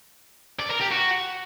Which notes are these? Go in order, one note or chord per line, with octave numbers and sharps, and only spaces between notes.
D5
A#4
G4
F#4